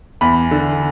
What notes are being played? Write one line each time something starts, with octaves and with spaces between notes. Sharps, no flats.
E2 B5
D3